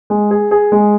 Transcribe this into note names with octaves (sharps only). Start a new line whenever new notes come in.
G#3
G#4
G#4
G#3